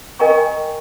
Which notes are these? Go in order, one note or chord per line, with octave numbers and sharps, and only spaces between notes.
A#4 D#5 G5 G#5 A#5 C#6